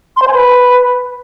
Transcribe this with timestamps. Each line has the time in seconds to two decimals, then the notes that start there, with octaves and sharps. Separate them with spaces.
0.16 C6
0.22 C5
0.28 G#5
0.33 B4